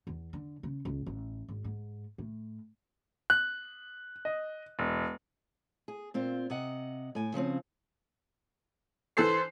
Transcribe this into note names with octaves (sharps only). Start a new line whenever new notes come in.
E2
D3
C#3
C#2
A1
G#1
G#2
A2
F#6
D#5
E1
G#4
A#2 C4 F4
C3 D#5 F#5
A2 G#5
C#3 F3 C4 C#4
E3 A4 C5 C7